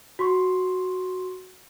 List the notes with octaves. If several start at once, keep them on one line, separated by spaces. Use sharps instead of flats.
F#4 C6 C#6